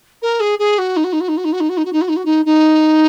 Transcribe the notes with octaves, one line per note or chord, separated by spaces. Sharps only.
A#4
G#4
G#4
F#4
D#4
F#4
D#4
F#4
D#4
F#4
D#4
F#4
D#4
F#4
D#4
F#4
D#4
F#4
D#4
F#4
D#4
D#4